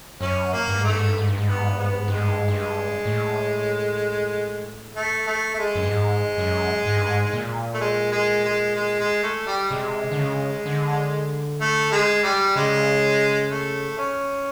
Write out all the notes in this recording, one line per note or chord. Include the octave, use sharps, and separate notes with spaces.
F#2 C#4
A#3
G2
G#2
G2 A3
G#2
G2
G#2
G2
G#2
G2 B3
G#2
G2
G#2 B3
G2
G#2
G2 G#3
G#2
G2
G#2
G2
G#3
A2
A3
A3
A3
G#3
F#2
G2
G#2 G#3
F#2
G#2
G2
G#2
A#2
A3
G#3
G#3
G#3
G#3
G#3
A3
G3
C3 G#3
D3
C#3
D3
A3
G#3
G3
C#3 G#3
A3
C#4